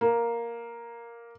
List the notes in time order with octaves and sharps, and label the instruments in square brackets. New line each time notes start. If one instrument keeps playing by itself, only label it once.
[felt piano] A#3